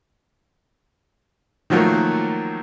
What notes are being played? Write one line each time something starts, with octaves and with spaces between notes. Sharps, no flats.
D#3 F3 F#3 A3 A#3